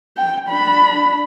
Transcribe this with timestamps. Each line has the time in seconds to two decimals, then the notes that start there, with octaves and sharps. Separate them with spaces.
0.17 G5
0.49 D4 B5